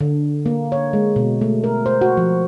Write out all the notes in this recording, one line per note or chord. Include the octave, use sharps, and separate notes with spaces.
D3
A#3
C#5
G#3
B2
A3
A#4
C5
F#4
F3